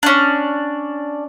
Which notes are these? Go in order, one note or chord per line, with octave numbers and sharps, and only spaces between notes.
C#4 D4